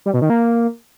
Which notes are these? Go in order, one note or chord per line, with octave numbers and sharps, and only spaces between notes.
G3
B2
D#3
A#3